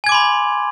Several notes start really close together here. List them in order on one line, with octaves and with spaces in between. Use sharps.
G#5 G#6 D6 C6 B5